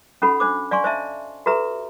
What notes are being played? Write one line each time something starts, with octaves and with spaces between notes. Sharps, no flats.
C#4 D#4 F#4 A4 F#5 B5
D4 C5 D6
D5 F5 G#5 C6 C#6
C5 D#5 E5 A5
F#4 G4 A4 B4 E5 A#5